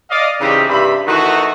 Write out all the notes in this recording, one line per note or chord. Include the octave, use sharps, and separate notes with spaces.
D5 D#5 F5
C#3 E3 G3 C4 D#4 G4
G2 C3 E5 B5
D#3 E3 A3 D#4 F#4